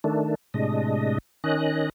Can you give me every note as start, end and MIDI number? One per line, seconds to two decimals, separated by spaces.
0.04 0.35 51
0.04 0.35 57
0.04 0.35 62
0.54 1.18 45
0.54 1.18 48
0.54 1.18 56
0.54 1.18 62
0.54 1.18 75
1.44 1.89 51
1.44 1.89 61
1.44 1.89 75
1.44 1.89 90